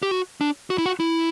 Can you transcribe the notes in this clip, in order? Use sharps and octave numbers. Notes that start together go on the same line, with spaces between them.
G4
F#4
D4
F#4
E4
F#4
E4